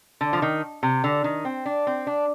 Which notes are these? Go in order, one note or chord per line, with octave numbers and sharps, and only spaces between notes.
D3
F3
D#3
C3
D3
D#3
C4
D4
C4
D4